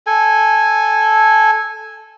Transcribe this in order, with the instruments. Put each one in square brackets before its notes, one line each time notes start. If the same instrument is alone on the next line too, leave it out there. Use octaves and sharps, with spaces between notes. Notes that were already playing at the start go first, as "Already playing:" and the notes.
[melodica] A4 G#5